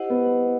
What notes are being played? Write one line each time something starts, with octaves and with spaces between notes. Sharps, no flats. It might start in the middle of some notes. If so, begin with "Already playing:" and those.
Already playing: E4 G4 C5 D#5 F#5
B3